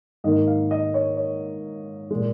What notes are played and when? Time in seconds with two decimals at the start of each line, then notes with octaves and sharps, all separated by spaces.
0.24 G#2 D#3 A#3 D#5
0.47 F5
0.71 D#5
0.94 C#5
1.17 C#5
2.11 A#2 G#3